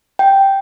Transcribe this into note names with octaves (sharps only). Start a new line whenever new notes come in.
G5